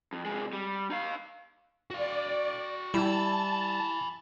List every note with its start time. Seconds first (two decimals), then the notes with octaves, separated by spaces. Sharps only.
0.13 F2
0.25 C3 G#3
0.53 G3
0.91 D#4 F5
1.90 F#4 D5 F5
2.94 G3 E4 G#5 A5 B5